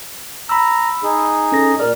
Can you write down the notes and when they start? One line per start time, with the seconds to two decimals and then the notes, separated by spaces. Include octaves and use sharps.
0.49 A#5 B5 E6
1.03 D#4 G#4
1.52 C#4 A4 A#6
1.80 A#2 A#4 D5 F6